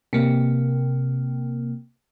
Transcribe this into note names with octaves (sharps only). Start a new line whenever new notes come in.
C3 A#3